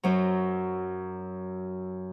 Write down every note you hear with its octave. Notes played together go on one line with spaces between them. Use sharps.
F#2 F#3